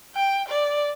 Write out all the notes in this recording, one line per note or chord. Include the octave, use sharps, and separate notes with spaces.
G5
D5